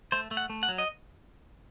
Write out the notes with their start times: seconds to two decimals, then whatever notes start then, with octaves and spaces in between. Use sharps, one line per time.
0.12 A3 C5
0.31 A3
0.37 F#5
0.50 A3
0.63 F#5
0.69 F#3
0.78 D#5